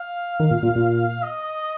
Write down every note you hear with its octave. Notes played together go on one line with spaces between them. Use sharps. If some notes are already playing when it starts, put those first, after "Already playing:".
Already playing: F5
D#3
A#2
A#2
A#2
D#5